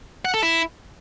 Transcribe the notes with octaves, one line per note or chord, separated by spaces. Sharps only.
F#5
A4
E4